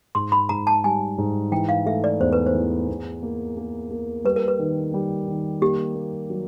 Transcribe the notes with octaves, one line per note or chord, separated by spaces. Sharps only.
G#2 C6
B5
G#2 A#5
A5
G3 G#5
G#2
E3 G5
F5
A3 E5
D5
E2 C5
B4
C5
E3
E2
A#3
A#3
A#3
G3 B4
A#4
B4
D#3
G3
D#3
A#3 G4
A#3
F#3